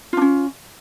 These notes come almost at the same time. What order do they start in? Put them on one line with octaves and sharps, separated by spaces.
F4 D4 C#4